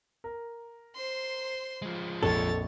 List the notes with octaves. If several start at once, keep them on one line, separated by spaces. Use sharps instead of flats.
A#4
C5 C6
F3 G#3
A#1 F2 A4 C#5 A6